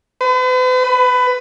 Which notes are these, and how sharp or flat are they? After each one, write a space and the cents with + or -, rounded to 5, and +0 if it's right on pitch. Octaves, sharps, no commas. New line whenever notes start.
B4 +45
B4 +20